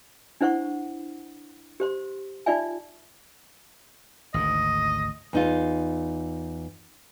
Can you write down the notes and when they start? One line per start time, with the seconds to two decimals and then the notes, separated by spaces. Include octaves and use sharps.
0.41 D4 E4 C5 F#5 C#6
1.80 G4 C5 C6
2.46 D#4 F4 D5 E5 G#5
4.34 G#1 D2 G#2 D#5
5.33 E2 D#4 F4